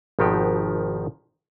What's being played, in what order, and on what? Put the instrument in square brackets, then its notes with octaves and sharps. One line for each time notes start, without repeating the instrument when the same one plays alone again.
[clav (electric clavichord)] G#1 B2 D#3 F3 F#4 G4